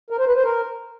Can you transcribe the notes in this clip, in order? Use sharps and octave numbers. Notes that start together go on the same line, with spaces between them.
A#4
C5
B4
C5
A#4